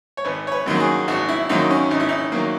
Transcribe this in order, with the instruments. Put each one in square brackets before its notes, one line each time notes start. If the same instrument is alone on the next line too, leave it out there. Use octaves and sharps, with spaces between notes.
[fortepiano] C#5
G#1 B4
C#5
B4
F#2 D#3 F#3 A#3
G#4
G#1 F#4
E4
F#2 D#3 F#3 A#3 D#4
C#4
G#1 D#4
E4
D#4
D#3 F#3 A#3